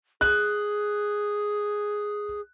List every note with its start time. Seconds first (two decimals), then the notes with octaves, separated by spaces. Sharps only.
0.21 G#4 F#6